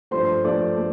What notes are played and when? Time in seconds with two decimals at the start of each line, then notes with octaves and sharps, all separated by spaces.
0.11 G2 F3 A3 C5 C6
0.44 G2 F3 A3 D5 D6
0.77 A3